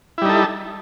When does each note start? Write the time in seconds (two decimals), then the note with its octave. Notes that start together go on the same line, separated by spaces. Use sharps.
0.18 E4
0.22 G3
0.25 D#4
0.29 A4